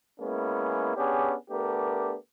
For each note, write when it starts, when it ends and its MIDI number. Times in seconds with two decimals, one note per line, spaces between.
0.20 0.94 56
0.20 0.94 58
0.20 0.94 59
0.20 0.94 61
0.20 0.94 64
0.96 1.35 59
0.96 1.35 61
0.96 1.35 62
0.96 1.35 67
0.96 1.35 68
1.51 2.15 57
1.51 2.15 59
1.51 2.15 62
1.51 2.15 67
1.51 2.15 70